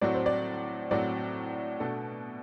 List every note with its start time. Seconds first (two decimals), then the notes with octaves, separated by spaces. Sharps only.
0.01 A2 F#3 C4 F#4 D5
0.14 C5
0.26 D5
0.91 A2 F#3 C4 F#4 D5
1.80 B2 A3 D4 F#4 A4